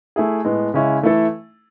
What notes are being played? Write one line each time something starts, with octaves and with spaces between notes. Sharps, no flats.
A3 E4 G#4
A2 G#3 B3
C#3 G#3 C#4 E4
E3 A3 E4 A4